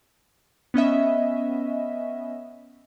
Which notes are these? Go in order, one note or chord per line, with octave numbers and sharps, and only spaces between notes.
B3 C#4 D#5 E5